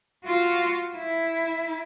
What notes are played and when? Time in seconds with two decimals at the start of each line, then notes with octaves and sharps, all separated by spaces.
0.24 F4 F#4
0.97 E4